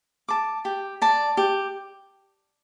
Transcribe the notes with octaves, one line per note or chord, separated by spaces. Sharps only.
A5 D6
G4
D5 A5
G4